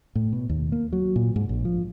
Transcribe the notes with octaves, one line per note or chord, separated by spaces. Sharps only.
A2
B2
D#2
A#3
F#3
A#2
G#2
A#1
F3